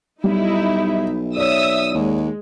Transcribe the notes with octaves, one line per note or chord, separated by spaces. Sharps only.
B1 G3 D#4 E4 E5
C#5 D5 E5 D#6 E6
D#2 G#3